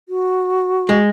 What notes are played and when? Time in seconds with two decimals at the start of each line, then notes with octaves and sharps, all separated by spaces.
0.09 F#4
0.89 G#3